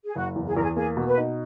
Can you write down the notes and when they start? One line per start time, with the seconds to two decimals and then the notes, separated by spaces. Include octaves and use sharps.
0.04 G#4
0.15 F#1 F#4
0.36 E2
0.46 G#4
0.55 E2 A#4
0.63 G#4
0.76 A#3 G#4
0.97 B2
1.07 B4
1.17 D#4